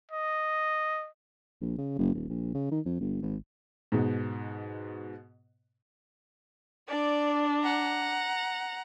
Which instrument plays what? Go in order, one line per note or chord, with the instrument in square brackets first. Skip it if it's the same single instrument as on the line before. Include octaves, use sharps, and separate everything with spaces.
[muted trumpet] D#5
[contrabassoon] A#1
C#3
F#1
D#1
A#1
C#3
D#3
F2
G1
G#1
[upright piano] G#2 B2
[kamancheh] D4 [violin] D5
[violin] F#5 A#5